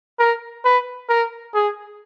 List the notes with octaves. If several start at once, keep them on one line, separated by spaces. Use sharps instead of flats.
A#4
B4
A#4
G#4